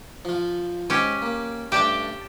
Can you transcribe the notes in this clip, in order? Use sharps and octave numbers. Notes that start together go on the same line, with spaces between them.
F3 F4
G#2 C#4 G4 G#5 A5
A#3
G2 A3 D4 G4 G5 A5